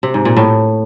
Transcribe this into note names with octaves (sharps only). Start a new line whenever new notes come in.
C3
G#2
A#2
A2